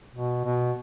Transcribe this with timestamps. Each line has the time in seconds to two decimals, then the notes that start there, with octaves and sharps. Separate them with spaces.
0.15 B2
0.44 B2